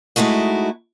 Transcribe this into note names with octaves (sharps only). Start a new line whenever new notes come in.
G#3 A3 D#4 E4 F#4